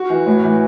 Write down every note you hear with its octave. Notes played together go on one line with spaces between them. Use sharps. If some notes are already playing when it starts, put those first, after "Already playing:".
Already playing: F#4
E3
A2
E3